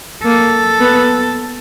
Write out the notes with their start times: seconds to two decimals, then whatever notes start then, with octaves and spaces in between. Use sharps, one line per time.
0.24 A#3 A4
0.80 B3